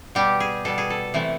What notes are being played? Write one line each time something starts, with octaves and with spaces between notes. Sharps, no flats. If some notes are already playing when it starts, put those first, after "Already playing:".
B2 G3 G4
G#4
B2 G3 A4
G#4
A4
C3 E3 A3